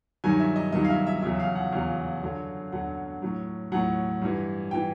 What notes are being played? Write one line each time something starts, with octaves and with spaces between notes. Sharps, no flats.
G2 D#3 F#3 G#5
E5
D#5
G2 D#3 F#3 D#5
F5
E5
E5
E2 C#3 F#3 E5
F5
F#5
E2 C#3 F#3 F5
F#2 D3 F#3
F#2 D3 F#3 F#5
A2 F#3
A2 F#3 F#5
G2 E3
E3 G5